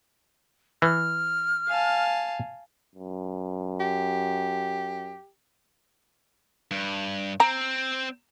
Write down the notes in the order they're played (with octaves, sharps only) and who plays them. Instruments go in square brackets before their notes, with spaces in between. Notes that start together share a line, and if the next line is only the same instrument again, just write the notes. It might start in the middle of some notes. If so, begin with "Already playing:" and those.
[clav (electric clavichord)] E3 [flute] F6
[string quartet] F5 G#5 A5
[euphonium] F#2
[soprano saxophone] G4
[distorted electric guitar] G2
[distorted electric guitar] C4 [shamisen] A#5